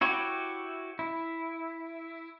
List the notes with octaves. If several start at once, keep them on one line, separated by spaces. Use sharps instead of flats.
E4 F#4 G4 C#5
E4